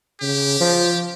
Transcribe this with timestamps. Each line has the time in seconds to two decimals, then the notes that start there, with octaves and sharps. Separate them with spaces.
0.21 C#3 G4
0.60 F3